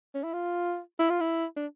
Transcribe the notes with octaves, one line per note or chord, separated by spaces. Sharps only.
C#4
E4
F4
E4
F4
E4
D4